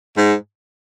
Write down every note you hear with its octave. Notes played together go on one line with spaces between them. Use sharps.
G#2